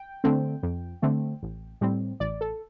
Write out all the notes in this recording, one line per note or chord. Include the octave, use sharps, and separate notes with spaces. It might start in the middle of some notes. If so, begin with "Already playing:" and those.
Already playing: G5
D3 A3 C4
F2
D3 A3 C4
A1
A2 G3 C4
A1 D5
A4